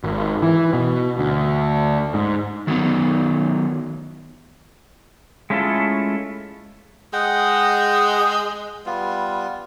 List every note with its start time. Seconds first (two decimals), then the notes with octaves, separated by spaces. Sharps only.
0.04 G#1
0.42 E3
0.73 B2
1.18 D2
2.14 G#2
2.67 D#3 F#3 A3 B3 D#4
5.50 G#3 A3 C#4 E4 F4 A4
7.13 G#3 D#5 F#5 G5
8.86 G3 B3 F4